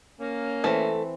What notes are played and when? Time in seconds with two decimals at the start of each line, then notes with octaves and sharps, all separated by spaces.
0.20 A#3 C#4
0.64 E3 A3 C4 E5